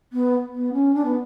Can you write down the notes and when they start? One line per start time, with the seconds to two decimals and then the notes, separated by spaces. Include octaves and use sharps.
0.12 B3
0.53 B3
0.73 C#4
0.94 D4
1.05 B3